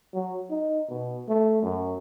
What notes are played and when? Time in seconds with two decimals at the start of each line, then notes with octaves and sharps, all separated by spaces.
0.14 F#3
0.50 D#4
0.89 B2
1.28 A3
1.62 F#2